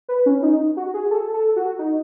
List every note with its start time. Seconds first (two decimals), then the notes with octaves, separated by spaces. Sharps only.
0.09 B4
0.26 C#4
0.43 D#4
0.77 F#4
0.94 G#4
1.11 A4
1.34 A4
1.56 F#4
1.79 D#4